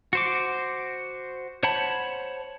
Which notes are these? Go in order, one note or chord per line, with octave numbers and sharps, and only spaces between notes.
F#4 C5 D6
C5 C#5 F#5 A5 B5